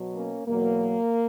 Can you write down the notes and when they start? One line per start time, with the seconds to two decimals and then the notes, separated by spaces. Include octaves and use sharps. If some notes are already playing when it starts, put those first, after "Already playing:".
Already playing: B2 F#3
0.15 A#3 C#4
0.47 E2 B2 F#3 A#3